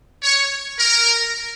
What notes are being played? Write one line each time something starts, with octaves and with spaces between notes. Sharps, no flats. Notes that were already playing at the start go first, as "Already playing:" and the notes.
C#5
A#4